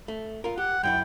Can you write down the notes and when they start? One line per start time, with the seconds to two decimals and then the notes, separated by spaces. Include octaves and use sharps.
0.08 A3
0.44 F4 A#4
0.58 G4 F#5
0.83 F#2 F#3 E4 G5